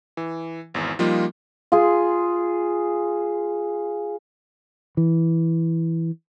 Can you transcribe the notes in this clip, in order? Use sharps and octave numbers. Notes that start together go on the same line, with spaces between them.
E3
G#1 E2
F3 G3 A#3 D#4 F4
F4 G#4
E3